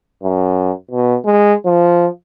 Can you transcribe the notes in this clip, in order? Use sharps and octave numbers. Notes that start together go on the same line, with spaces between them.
F#2
B2
G#3
F3